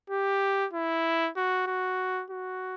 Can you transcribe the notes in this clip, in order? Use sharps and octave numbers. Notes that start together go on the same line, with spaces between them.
G4
E4
F#4
F#4
F#4